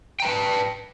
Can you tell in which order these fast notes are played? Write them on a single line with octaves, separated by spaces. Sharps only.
G5 A#5 B4 A5